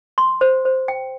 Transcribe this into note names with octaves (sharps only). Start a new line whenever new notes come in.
C6
C5
C5
G5